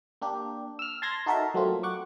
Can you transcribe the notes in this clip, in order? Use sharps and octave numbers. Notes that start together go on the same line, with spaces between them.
A#3 D4 G4
E6 F6
A5 C6 G#6 A#6
D#4 F#4 A4 A#4 E5
F#3 A3 A#3 C4 F4
F#5 C#6 D6